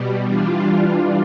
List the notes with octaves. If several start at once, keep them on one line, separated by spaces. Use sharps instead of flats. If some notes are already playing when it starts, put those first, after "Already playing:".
Already playing: B2 G3
E3 G3 D4 F4